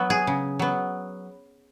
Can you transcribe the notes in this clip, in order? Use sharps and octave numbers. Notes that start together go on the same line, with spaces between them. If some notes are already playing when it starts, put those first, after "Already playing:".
Already playing: F#3 B3 B4
G#4
C#3
F#3 B3